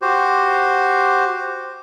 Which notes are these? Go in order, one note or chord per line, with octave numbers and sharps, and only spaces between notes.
F#4 G4 C5